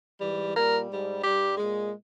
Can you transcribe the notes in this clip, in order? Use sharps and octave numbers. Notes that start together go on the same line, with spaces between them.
G#2 E3 G3
A#2 G3 A#4
G#2 G3
G2 G3 G4
A#2 G#3